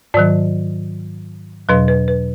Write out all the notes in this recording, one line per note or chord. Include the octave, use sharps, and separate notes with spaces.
G#2 D#3 F#3 D5
E2 B2 F#3 B4
B4
B4